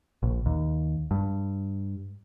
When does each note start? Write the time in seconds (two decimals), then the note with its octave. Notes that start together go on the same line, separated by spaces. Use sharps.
0.23 A#1
0.46 D#2
1.11 G2